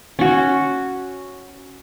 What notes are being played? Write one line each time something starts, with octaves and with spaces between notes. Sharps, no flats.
C#4 F#4